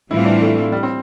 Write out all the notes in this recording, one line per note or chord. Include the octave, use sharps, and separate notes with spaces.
A2 E3 G3 C4 E4 F4
D4
A3
G3
C4